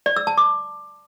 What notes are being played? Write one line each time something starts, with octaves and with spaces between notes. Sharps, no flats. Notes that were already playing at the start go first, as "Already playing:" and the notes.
D5
E6
A5
D6